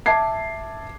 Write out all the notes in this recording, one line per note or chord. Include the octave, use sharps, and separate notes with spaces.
E5 A5 D6 G#6 C7